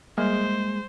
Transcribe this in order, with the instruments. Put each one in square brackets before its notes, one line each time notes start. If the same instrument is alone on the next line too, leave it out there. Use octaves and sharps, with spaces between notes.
[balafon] G3 [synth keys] G#3 [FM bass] A#3 [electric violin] C5